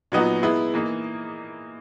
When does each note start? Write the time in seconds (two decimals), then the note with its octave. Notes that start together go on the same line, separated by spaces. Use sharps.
0.12 A#2 F#3 B3 D#4 F#4
0.42 G#3 B3 E4
0.74 E3 A#3 D#4